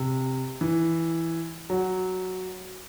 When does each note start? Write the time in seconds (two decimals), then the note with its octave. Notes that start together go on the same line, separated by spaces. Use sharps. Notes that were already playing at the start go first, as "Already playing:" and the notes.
Already playing: C3
0.61 E3
1.70 F#3